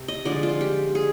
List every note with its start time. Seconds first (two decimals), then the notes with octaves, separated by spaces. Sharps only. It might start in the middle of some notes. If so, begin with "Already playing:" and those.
Already playing: C3
0.08 D#5
0.25 D3 F3 G#3 D5
0.43 F4
0.61 G4
0.95 G#4